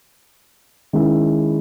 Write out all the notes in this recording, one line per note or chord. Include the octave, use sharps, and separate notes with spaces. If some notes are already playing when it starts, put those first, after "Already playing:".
D#3 G#3 C#4 E4 G#4